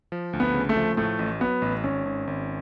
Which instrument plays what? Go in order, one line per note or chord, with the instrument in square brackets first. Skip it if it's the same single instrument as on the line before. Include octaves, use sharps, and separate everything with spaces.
[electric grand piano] F3
D2
[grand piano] B3
[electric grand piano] C#3
[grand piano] A3
[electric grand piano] F3
[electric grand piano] A2 [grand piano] A3
[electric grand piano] A1
[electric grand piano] F#3 [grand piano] B3
[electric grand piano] A1
[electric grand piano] G#1 [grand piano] C#4
[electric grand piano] G#1
G#1